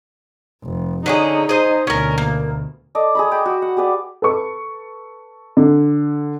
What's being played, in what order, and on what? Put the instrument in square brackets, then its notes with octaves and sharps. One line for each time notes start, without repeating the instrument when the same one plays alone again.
[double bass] F1
[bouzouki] D3 C#4 G#4 [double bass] D#4
[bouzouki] G#4 C5 D#5
[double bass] D2 B2 [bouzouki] C#4 A#4
[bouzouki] A#3
[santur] A4 D5 D#5
G#4 A#5 B5
G5 B5 E6
F#4
F#5
G4 G#4 B4 D5
[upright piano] A4 B4 C#6
D3